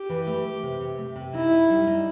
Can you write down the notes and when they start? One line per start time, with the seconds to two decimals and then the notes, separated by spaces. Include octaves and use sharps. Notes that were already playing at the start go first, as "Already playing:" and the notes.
Already playing: G4
0.09 E3
0.27 A3
0.45 A3
0.63 C3
0.80 C3
0.98 A3
1.16 C3
1.34 D#4 E4
1.52 D#4
1.70 G3
1.87 D#4